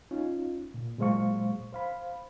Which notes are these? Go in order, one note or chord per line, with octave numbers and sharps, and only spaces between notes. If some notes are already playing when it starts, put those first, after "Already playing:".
C#4 D#4 F4
A#2
A#2 F#3 G#3 C5 F5 C#6
C5 F5 B5